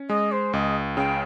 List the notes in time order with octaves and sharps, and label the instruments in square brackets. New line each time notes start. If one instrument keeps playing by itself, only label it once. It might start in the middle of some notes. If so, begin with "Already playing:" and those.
Already playing: [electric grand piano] C#4
[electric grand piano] G#3 [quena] D#5
[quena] C5
[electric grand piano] C#2 [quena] D#5
[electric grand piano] C#3 [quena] G5